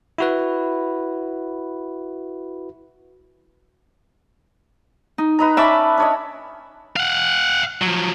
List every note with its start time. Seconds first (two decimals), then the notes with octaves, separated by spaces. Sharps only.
0.18 E4 F#4 B4
5.18 D#4
5.39 B4 D#5 A#5
5.57 C#4 D5 E5 A5 B5 D6
5.98 D4 C#5 D#5
6.96 F5 F#5
7.82 F3 F#3